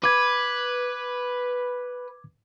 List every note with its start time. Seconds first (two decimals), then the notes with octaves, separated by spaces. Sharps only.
0.04 B4 D6 G#6